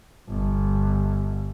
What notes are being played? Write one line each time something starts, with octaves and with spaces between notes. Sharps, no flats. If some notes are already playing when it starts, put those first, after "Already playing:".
G1